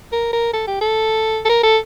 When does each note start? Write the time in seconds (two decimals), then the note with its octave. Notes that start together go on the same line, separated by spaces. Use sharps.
0.12 A#4
0.33 A#4
0.53 A4
0.67 G4
0.81 A4
1.45 A4
1.50 A#4
1.63 A4